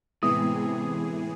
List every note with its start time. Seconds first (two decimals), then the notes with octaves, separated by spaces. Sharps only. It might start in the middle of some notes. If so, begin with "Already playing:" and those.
0.23 A2 C3 E3 G#3 B3 E4 G#4 D#6